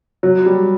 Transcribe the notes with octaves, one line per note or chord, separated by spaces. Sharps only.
F#3
G3